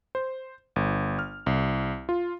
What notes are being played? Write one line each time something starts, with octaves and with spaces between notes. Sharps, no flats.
C5
G1
F6
C2
F4